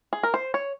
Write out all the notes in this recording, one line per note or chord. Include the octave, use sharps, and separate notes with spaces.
G#4
A#4
C5
C#5